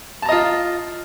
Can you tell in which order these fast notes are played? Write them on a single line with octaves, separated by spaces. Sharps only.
A5 A#5 D#5 F4